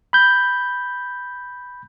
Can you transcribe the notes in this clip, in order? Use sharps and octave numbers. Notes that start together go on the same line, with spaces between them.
B5 G6